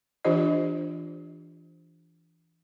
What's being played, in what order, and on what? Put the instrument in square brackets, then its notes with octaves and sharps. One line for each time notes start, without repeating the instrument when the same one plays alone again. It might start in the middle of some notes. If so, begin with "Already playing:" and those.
[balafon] E3 D4 F4 G4 C5 D#5